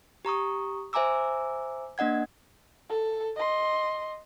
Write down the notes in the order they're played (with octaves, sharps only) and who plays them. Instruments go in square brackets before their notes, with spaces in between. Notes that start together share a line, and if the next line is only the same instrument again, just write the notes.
[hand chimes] G4 A#5 C#6 D#6
C5 E5 G#5 A#5 D6 E6
A#3 D4 D#5 F#5 G#6
[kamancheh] A4
D#5 C6